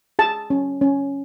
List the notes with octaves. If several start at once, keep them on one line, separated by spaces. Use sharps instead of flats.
G#4 A5
C#4
C#4